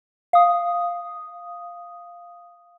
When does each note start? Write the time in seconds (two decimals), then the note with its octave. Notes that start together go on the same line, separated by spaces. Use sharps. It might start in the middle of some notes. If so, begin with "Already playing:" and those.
0.33 F5 D#6